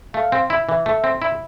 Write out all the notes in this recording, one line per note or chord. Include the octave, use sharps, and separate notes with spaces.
A3 F5
C4
E4
E3
A3 E5
C4
E4